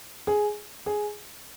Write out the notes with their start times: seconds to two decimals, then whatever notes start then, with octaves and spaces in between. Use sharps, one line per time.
0.27 G#4
0.86 G#4